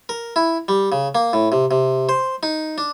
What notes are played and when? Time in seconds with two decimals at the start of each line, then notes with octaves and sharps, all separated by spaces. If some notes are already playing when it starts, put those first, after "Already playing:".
0.09 A#4
0.36 E4
0.68 G3
0.92 C#3
1.15 A#3
1.33 A2
1.52 C3
1.71 C3
2.09 C5
2.43 D#4
2.78 D4